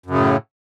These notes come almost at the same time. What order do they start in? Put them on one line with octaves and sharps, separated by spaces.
F#2 C#3 A2